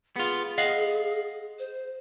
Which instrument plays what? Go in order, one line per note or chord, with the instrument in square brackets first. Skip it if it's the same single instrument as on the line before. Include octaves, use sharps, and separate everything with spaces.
[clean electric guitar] B3 F4 [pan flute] G#4
[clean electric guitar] D#5 F5 F#5
[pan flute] C5